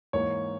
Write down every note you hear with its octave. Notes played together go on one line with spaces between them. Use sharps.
G#2 E3 A#3 C#5